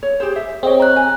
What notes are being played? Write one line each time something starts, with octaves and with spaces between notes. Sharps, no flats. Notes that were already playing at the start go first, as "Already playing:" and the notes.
C#5
G4 G#4 C5
E5
C4 G#4 C#5 D#5 G5
A#5 F#6
G#5